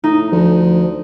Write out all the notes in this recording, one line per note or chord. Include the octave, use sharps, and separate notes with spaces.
A2 D#4
D2 F3